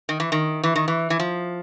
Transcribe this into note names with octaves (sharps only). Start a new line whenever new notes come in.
D#3
E3
D#3
E3
D#3
E3
E3
F3